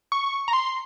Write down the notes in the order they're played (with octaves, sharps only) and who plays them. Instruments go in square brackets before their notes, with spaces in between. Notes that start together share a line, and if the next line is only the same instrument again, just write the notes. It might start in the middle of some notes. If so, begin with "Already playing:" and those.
[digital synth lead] C#6
A#5
C6